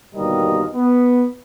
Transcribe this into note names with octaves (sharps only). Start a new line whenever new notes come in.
G1 D#2 B2 G3 A#4 D#5
B3